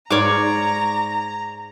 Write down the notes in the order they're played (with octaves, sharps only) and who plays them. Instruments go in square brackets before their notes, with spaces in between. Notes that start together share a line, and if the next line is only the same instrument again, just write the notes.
[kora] G#2 F5 [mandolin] C#5 D5 D6 [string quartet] A#5